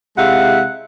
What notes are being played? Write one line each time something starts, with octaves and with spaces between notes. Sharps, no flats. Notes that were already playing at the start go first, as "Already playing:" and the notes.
C3 G#3 E4 F5 F#5